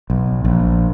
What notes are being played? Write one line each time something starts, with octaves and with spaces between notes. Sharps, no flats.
B1
A#1